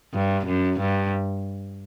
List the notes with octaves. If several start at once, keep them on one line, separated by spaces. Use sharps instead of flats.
G2
F#2
G2